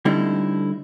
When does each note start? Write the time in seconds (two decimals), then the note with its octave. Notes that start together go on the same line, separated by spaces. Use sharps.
0.05 D3 G3 A3 C4 D#4 E4